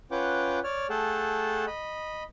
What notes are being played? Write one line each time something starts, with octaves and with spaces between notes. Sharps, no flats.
C#4 F4 B4 F#5 G5 D6
C#5 D5 F6
A3 G#4 A4 F#5 G5 A5
D#5 B5